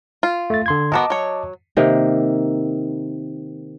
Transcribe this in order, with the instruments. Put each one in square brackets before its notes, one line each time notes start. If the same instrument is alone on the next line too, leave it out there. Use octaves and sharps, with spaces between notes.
[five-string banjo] F4
[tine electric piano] A3 A6
D3 C6 G#6
[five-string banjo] B3 F#4 A#4 [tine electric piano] D#5 A5 D6
[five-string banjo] F#3 C#5
[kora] C3 D#3 A#3